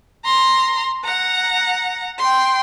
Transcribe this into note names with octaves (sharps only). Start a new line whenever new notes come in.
A#5 C6
F#5 A#5
G5 C6